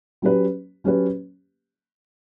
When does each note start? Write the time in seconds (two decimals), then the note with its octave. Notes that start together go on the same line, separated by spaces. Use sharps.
0.22 F#3 C#4 G4 B4
0.84 F#3 C#4 G4 B4